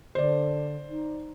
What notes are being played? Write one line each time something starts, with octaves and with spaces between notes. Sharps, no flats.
D3 C5 D5
D#4